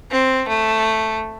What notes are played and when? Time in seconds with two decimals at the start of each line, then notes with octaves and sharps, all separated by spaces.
0.11 C4
0.48 A3